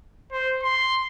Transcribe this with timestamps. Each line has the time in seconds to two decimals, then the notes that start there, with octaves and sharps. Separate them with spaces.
0.32 C5
0.63 C6